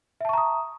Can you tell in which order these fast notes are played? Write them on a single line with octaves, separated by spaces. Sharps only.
E5 A5 C#6 A#5 D#6